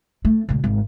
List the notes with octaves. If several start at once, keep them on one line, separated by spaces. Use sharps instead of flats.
A3
C#2 A#2
G#1